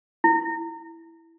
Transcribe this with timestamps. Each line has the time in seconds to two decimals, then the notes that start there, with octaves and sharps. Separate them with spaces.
0.24 E4